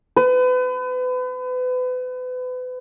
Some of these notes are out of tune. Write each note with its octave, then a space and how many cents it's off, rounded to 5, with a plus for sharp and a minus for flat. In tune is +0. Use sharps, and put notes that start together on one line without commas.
B4 +35